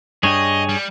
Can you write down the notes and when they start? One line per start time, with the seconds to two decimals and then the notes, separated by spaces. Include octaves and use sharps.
0.23 G2 D4 G#4 C#5 D#5 G5
0.69 G3